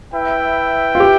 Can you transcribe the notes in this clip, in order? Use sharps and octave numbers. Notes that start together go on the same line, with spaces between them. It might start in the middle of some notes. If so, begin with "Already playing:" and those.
E4 B4 E5 G5
F4
G4